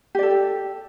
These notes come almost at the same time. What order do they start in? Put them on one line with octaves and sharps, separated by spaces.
G4 D5 A4